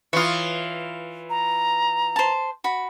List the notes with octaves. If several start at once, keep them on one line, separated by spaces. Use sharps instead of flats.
E3 F4 C#5 D#6
A#5
C5 A5
F#4 B5